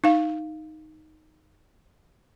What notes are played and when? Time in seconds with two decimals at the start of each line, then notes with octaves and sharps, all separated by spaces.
0.04 D#4 F5